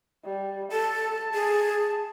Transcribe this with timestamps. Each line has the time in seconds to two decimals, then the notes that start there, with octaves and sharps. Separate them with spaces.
0.25 G3
0.72 A4 A5
1.34 G#4